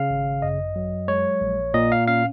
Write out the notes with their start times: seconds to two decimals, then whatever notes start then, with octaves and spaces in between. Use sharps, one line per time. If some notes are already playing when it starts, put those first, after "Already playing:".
Already playing: C#3 F5
0.10 G#1
0.42 F#2 D#5
0.76 F#3
1.08 G#3 C#5
1.41 A#1
1.74 A#2 D#5
1.92 F5
2.08 C#4 F5